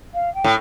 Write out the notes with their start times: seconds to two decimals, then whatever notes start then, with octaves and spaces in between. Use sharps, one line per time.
0.14 F5
0.34 G5
0.44 A2